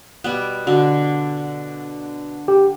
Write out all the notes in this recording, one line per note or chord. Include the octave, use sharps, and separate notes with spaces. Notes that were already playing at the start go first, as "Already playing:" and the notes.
B2 G3 B3
D3 F#4
G4